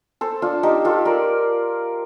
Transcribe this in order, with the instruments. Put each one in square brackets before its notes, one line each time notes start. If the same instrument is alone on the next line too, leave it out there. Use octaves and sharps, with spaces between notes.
[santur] A4 C5
D4 F4
D#4 G4
F4 A4
A#4 D5